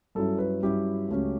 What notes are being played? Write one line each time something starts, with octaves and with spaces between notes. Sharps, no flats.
G2 F#3 C#4 E4 A4
B4
G2 F#3 C#4 E4 G4
C#2 C#3 F#3 A3 C#4